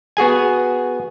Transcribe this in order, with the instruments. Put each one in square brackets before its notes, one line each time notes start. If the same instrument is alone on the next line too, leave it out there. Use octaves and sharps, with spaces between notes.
[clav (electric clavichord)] B3 F#4 G#4 G#5